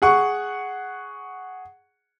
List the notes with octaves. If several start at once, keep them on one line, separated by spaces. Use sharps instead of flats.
G#4 F#5 C#6